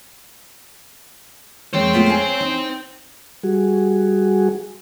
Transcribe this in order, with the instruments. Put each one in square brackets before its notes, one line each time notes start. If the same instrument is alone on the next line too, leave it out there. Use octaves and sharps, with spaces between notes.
[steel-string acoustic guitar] F2 G#3 A#3 [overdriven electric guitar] C5 G5 [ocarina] C#5
[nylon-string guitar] A3 B3 F4
F5 G#5
[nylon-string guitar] C4 [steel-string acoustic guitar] D#4
[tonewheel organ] G3 F#4 G#4